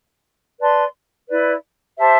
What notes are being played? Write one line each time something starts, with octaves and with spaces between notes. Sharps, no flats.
B4 D5 A5 C6
E4 B4 D5
G4 C5 E5 A5